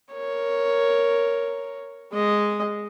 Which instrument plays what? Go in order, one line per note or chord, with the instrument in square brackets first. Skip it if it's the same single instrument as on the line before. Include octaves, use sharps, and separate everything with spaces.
[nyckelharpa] A#4 C#5
G#3 D#5